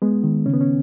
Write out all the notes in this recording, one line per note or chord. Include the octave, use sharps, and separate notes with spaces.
G#3 B3
D#3
C#3 C#4
B3
C#4